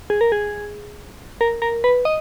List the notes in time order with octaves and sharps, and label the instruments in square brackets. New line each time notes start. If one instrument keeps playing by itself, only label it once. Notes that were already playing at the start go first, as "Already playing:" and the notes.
[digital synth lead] G#4
A#4
G#4
A#4
A#4
B4
D#5